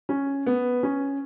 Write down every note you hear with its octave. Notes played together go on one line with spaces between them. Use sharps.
C#4
B3
C#4